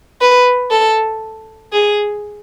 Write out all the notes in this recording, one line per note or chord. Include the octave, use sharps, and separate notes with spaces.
B4
A4
G#4